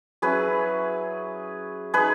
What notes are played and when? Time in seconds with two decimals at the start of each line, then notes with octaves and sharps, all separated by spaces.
0.22 F#3 C#4 E4 G#4 B4
1.94 G#3 D#4 G#4 B4